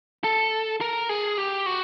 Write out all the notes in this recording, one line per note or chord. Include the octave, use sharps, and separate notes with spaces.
A4
A#4
G#4
G4
F#4